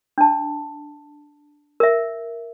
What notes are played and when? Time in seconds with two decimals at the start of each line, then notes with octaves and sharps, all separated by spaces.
0.18 D4 A5
1.80 A#4 E5